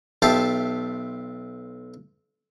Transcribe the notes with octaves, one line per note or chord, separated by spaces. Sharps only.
B1 F4 G4 E5 F5 A5